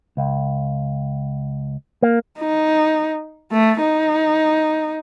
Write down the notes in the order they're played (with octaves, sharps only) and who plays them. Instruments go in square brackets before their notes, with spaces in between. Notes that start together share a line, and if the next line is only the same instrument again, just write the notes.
[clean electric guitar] C#2
A#3
[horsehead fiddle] D#4
A3
D#4